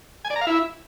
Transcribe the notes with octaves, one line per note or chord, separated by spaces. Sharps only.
G#5
D5
A#5
F5
E4